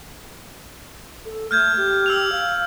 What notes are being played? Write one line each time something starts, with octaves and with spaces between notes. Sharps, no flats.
A4
A3 F6 G6 G#6
G4
E6 F6 F7
F5